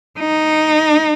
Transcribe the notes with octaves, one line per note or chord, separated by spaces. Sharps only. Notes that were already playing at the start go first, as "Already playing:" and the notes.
D#4